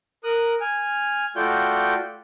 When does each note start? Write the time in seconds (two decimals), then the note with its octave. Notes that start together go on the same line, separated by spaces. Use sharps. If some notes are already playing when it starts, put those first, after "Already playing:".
0.24 A#4 D#6 F#6
0.61 G#5 F6
1.36 A3 F4 F#4 D5 G5 G6